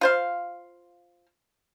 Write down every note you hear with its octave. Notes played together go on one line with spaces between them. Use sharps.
F4 C5 F5